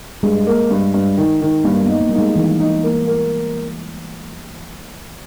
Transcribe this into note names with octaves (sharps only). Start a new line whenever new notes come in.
G2 G#3
A#3
G2
G2
D#3
D#3
G2 A#3
B3
D#4
A#3
G3 D#4
G#3
D#3 E3
D#4
A#3
A#3